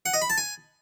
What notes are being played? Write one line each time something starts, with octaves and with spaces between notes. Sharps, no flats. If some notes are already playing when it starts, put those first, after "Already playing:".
F#5
D#5
B5
A5
G#5